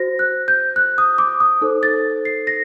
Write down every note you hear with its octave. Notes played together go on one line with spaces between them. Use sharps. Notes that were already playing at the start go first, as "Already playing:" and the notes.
Already playing: F#4 C5 A#6
F#6
G6
F#6
D#6
D6
D#6
D#4 A4 C5
A6
C7
A#6